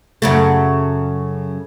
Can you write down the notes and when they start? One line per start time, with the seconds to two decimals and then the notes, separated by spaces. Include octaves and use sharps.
0.22 F#2 C#3 A3